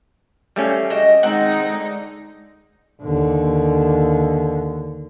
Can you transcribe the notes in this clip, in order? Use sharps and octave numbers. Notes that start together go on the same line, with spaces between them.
E3 G3 A3 C#4 F5
F#4 G4 D#5
D#3 G#3 C4 D#4 F#5
D3
D#2 D3